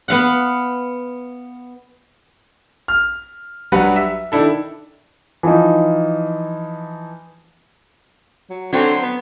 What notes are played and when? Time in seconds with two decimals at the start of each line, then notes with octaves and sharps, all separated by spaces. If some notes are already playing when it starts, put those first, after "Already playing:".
0.08 B3 F5 F#5
2.88 F6
3.72 F#3 G3 D4 B4 F#5
3.96 E5
4.32 D#3 D4 E4 A4
5.43 E3 F3 D#4
8.50 F#3
8.73 D3 F#3 C4 F#4
9.02 B3